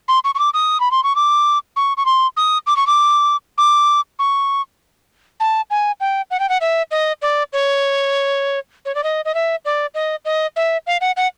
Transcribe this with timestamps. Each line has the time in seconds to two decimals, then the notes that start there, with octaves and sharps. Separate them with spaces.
0.08 C6
0.25 C#6
0.35 C#6
0.39 D6
0.54 D#6
0.80 B5
0.91 C6
1.04 C#6
1.16 D6
1.76 C#6
1.97 C#6
2.06 C6
2.37 D#6
2.67 D6
2.77 C#6
2.87 D6
3.58 D6
4.19 C#6
5.40 A5
5.70 G#5
6.00 G5
6.31 F#5
6.40 G5
6.49 F#5
6.61 E5
6.91 D#5
7.22 D5
7.53 C#5
8.85 C#5
8.95 D5
9.03 D#5
9.25 D#5
9.34 E5
9.65 D5
9.95 D#5
10.25 D#5
10.56 E5
10.87 F5
11.01 F#5
11.17 F#5